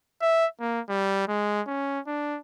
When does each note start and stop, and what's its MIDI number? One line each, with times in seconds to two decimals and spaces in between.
0.22 0.46 76
0.60 0.81 58
0.89 1.28 55
1.28 1.62 56
1.67 2.00 61
2.07 2.38 62